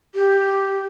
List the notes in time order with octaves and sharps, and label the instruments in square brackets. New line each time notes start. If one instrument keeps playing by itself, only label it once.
[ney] G4